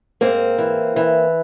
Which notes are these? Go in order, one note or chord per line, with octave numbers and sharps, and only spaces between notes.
G#2 A#3 C4
E3
E3